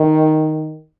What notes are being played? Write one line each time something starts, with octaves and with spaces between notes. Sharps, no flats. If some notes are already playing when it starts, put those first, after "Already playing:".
Already playing: D#3